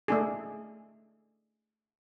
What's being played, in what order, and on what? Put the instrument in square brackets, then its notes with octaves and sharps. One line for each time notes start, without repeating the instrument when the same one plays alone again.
[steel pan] A3 D4 G#4